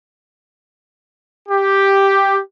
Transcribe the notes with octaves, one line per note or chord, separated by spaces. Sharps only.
G4